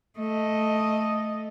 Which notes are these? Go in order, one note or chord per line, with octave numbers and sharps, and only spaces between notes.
A3 D#5